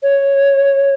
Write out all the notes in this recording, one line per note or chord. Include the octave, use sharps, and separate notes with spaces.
C#5